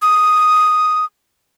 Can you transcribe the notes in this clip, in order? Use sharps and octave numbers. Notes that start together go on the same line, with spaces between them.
D#6